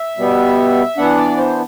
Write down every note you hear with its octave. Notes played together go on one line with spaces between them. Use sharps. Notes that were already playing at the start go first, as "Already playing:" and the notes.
Already playing: E5
B2 G3 B3
E3 B3 D4 F#5
D5
C5